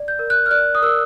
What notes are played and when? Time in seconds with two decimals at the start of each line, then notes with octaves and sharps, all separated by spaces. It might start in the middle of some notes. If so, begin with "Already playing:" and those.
Already playing: D5
0.08 G6
0.19 A#4
0.30 F#6
0.46 F6
0.51 D5 F#6
0.75 D#6
0.82 A#4 E6